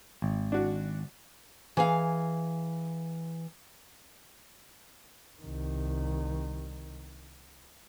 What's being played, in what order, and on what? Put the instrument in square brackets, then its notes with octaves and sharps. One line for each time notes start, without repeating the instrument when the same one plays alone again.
[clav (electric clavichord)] G#1
[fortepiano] D4 F#4
[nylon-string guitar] E3 G#4 F5
[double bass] C2 D#3